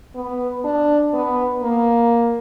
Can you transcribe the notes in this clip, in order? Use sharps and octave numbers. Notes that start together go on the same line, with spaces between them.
B3
D4
B3
A#3